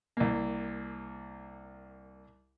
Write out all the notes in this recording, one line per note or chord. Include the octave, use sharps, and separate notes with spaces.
C2 A#3